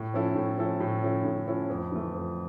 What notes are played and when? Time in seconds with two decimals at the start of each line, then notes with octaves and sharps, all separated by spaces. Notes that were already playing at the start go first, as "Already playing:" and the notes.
Already playing: A2
0.14 F3 C#4 E4 A4
0.35 A2
0.58 F3 C#4 E4 A4
0.80 A2
1.03 F3 C#4 E4 A4
1.24 A2
1.47 F3 C#4 E4 A4
1.69 F2
1.92 E3 A3
2.14 F2